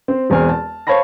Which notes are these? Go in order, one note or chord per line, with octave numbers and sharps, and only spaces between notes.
C4 C5
E1 E2 C4 C5 G#5 F6
A5
C5 C#5 F5 A5 B5 A#6